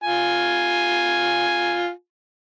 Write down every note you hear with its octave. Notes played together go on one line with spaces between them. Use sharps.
F4 G#5